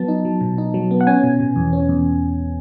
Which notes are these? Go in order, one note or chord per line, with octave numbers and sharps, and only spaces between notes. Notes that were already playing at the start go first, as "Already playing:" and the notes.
Already playing: F#3 B3 A5
D#4
F#3
B2
D#4
F#3
B3
F#5
C#4 G#5
B2
B2
E2
C#4
E2